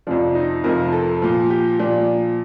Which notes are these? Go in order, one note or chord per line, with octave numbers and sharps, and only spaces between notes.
F2 C3 F3 D4
D#4
F2 C3 F3 A#4
A4
A#2 F3
G4
A#2 F3 D4